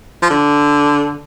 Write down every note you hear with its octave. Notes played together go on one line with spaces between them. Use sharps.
F3
D3